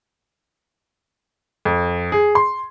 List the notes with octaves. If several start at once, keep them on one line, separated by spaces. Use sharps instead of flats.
F2
G#4
C6